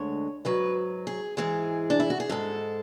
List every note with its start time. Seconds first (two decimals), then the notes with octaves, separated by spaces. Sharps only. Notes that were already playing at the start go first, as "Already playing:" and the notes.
Already playing: D2 D3 G#3 C#5
0.45 G#2 F#3 B4
1.07 G#4
1.37 G#2 E3 G#3 G#4
1.90 D4
2.00 E4
2.10 F#4
2.20 G#4
2.29 G#2 G#3 A4